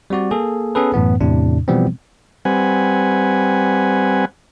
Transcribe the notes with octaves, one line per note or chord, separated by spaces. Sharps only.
G3 C4 F#4 D5
A#3 G#4 A4
B3 C#4 G#4 A4 B4
F#2 A2 E3 B3
E2 A2 C3 D4
B2 E3 F3 G3 B3 C4
G3 C4 B4 F#5 G#5